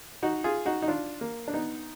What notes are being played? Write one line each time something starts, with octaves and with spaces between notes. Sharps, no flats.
D#4 F#4
F4 G#4
D#4 F#4
D#4
D4 F4
A#3
D4
B3 D#4